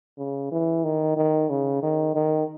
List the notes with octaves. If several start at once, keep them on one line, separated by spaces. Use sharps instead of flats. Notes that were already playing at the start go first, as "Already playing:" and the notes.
C#3
E3
D#3
D#3
C#3
D#3
D#3